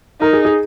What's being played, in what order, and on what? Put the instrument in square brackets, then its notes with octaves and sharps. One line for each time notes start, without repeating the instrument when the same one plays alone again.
[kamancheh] D#4 [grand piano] A#4
[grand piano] G#4
G#4